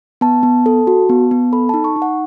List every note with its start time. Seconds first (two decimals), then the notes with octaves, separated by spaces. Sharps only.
0.21 B3 A5
0.43 B3
0.66 A4
0.87 F#4
1.09 B3
1.31 B3
1.53 A4 B5
1.69 D#4 A5
1.84 C#6
1.96 D#4
2.02 F#5